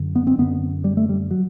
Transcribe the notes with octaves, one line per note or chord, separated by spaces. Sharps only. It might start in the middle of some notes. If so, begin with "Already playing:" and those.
Already playing: F#2 D3
B3
C4
F#2 D3 B3
G3
A3
G3
F#3